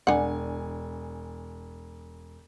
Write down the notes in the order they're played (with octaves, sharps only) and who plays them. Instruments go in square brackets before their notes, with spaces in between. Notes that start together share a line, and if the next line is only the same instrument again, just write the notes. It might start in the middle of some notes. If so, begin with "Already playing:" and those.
[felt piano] E1 G#5 [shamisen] D4 F#5